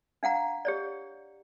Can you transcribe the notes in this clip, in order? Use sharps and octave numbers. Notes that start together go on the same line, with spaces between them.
D4 F5 F#5 A#5
G4 C#5 D5